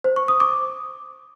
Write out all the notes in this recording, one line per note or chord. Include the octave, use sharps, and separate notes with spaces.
C5
C#6
D#6
D6